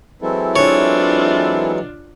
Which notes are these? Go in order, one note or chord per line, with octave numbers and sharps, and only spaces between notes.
E3 F#3 G#3 C4 E4 A4
D4 F4 C#5